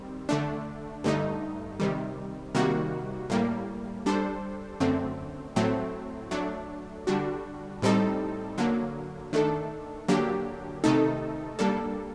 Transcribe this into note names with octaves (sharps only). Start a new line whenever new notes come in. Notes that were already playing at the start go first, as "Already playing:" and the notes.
Already playing: D#3 G3 C4
D3 A3 D4
G2 D3 A3 D#4
C3 D#3 G3
C3 D#3 G3 A#3 F#4
A2 G3 A#3
G3 D4 A4 C5
F#2 D3 A3 C4
A2 F#3 A3 C4
F#3 A3 D4
D3 G3 D4 F#4
A2 G3 C4 D#4 A4
D3 F#3 A#3
D#3 A3 D4 A4
D3 F#3 A#3 D4 G4
C3 D#3 A3 D#4 A4
G3 A#3 D4 A4